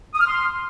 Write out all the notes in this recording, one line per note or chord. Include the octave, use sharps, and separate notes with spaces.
D#6
F6
C6